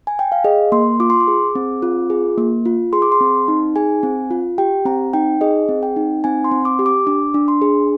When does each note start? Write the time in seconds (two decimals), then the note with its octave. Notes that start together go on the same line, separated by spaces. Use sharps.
0.07 G#5
0.19 G5
0.32 F5
0.44 G#4 D#5
0.72 A#3 C6
1.00 F4 D6
1.10 C6
1.20 D6
1.28 G#4
1.55 C4
1.82 F4
2.10 G#4
2.38 A#3
2.66 F4
2.93 G#4 C6
3.02 D6
3.12 C6
3.21 C4
3.48 D#4
3.76 G#4 G#5
4.03 C4
4.31 F4
4.58 G4 G5
4.86 C4 A#5
5.13 D#4 G5
5.41 G#4 D#5
5.69 C4
5.83 G5
5.96 D#4
6.24 C4 G#5
6.44 C6
6.51 C4
6.65 D6
6.79 G4
6.86 D6
7.07 D4 D6
7.34 D4
7.48 C6
7.62 G#4